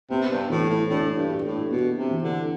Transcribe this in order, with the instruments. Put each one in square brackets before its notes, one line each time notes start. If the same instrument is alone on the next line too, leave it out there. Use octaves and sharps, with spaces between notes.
[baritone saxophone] C3 [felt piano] B3
[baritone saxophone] G2
[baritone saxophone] A2 [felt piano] E3
[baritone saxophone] A2
[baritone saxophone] A2 [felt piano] D4
[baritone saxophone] G2
[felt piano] G4
[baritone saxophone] A2
[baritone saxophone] B2 [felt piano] B3
[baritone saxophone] C3
[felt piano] E3
[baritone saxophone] D3